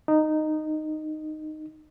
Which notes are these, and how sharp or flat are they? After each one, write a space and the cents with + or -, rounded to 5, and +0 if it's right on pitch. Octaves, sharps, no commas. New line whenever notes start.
D#4 -10